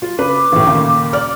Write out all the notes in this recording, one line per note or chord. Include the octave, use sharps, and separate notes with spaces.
F4
C#3 B4 D6
A1 A2
D#2 A#2 C#3
D5 D6 F6